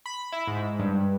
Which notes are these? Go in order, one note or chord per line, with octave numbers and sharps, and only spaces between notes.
B5
E4
G#2
G2